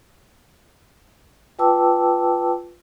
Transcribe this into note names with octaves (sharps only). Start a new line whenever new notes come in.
F4 B4 G5 A5 D6 E6